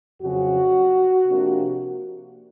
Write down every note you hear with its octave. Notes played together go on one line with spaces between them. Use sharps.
F2 C#3 F#3 F#4
C3 F3 A#3 D4